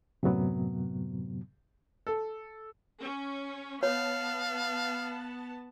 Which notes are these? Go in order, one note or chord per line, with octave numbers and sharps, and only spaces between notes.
F#2 A2 C3 F#3 B3
A4
C#4
B3 C#5 F5 A5